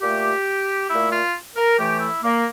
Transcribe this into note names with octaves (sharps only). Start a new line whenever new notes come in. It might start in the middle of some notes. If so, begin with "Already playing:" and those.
A#2 A3 G4
A#2 A3 E4
F4
A#4
A2 E3 A3 G4
E4
A#3